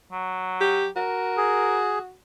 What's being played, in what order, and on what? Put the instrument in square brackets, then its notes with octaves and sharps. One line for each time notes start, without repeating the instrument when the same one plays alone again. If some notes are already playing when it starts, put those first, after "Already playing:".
[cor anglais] F#3
[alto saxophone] G4
[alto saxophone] F#4 [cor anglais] A#4
[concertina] G#4